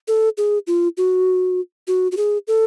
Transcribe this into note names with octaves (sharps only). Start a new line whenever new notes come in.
A4
G#4
F4
F#4
F#4
F#4
G#4
A4